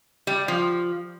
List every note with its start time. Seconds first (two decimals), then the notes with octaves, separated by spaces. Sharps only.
0.27 G3
0.48 F3